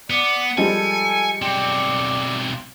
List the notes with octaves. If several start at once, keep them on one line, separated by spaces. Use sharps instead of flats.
B3 D5 C#7
F3 G3 G#3 A4 G#5
B1 C4 D5